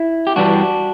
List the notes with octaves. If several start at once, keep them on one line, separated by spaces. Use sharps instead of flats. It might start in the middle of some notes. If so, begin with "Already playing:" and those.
Already playing: E4
G4
G2 E3 G3 D4 F#4